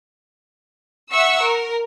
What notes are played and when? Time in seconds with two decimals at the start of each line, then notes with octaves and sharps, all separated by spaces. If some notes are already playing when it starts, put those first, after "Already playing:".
1.11 E5 F#5 C#6 E6
1.42 A#4